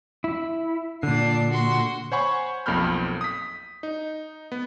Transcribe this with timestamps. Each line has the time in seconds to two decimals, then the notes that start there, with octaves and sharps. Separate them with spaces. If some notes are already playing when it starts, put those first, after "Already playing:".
0.24 E4
1.03 A#2 D3 D4 C7
1.51 F#4 C6
2.12 C5 C#5 F#5 G#5 B5 C#6
2.66 B1 F2 A#3 B5 F6 G6
3.21 D#6 B6
3.83 D#4
4.52 B3